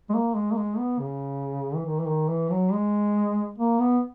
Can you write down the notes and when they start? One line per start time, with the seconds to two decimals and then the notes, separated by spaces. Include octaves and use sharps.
0.10 G#3
0.14 A#3
0.36 G#3
0.52 A#3
0.58 G#3
0.78 B3
1.00 C#3
1.76 E3
1.86 D#3
2.00 E3
2.07 D#3
2.29 E3
2.51 F#3
2.72 G#3
3.59 A#3
3.80 B3